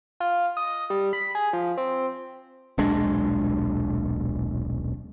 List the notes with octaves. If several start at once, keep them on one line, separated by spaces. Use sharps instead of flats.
F4
D#5
G3
B5
G#4
F3
C4
D#1 B1 G#3 D4